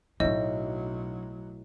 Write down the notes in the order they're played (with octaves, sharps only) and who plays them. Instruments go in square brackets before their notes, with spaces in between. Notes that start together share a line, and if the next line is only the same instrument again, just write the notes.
[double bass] B1 F#3 [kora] A2 [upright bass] D4 D#4 [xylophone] D#5